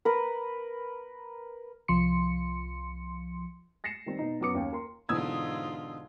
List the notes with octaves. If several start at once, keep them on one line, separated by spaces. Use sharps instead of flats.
A#4 B4
C2 F3 C6 C#7
A6 A#6 C7 C#7 E7
D#3 G3 C4
B2 D#4
F#2 F#3 B3 D6 D#6 C#7
D#2 C#4 G5
A#4 C6
G#2 B2 D3 E3 F4 D#6 E6 G#6